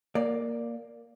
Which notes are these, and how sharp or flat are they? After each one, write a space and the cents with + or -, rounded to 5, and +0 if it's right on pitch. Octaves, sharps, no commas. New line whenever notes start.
A#3 +0 D5 +0